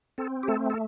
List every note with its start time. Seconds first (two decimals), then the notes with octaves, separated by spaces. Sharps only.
0.18 C4 A4
0.43 G4
0.48 A3 A4
0.70 A4